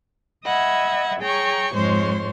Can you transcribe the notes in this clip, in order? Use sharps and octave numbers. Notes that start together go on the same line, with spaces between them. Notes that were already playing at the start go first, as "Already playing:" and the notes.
D#5 E5 F#5 B5 G#6
G#4 C#5 G5 A#5 C#6
F2 G#2 G#3 C5 C#5 C6